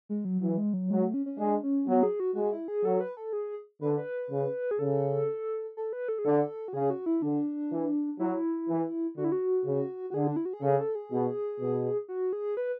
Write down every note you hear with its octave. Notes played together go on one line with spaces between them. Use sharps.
G#3
F#3
E3 F#3
G#3
F#3
F#3 G#3
A3
C#4
C#4
G#3 D4
C#4
F#3 B3
G#4
F#4
G#3 F#4
E4
G#4
F#3 A4
B4
A4
G#4
D3 B4
B4
C#3
G#4
C#3 A4
A4
B4
A4
G#4
D3 A4
F#4
C#3 G#4
F#4
E4
D3 D4
E3
F#3 E4
E3
D3 F#4
E4
F#4
C#3
F#4
D3 G#4
D4
E4
F#4
G#4
C#3 A4
A4
G#4
B2
B2
F#4
G#4
B4